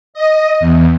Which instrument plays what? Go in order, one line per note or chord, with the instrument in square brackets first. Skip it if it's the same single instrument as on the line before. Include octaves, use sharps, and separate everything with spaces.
[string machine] D#5
E2